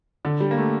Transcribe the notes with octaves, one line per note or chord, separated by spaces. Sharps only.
D3
G3
A#3
A3